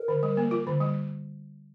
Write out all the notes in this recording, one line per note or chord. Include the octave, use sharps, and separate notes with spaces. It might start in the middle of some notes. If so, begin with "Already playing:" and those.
Already playing: A#4
D3
G3
A#3
F4
D3
G3